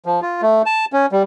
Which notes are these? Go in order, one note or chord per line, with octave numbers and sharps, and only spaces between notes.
F3
F4
A3
A5
C#4
G3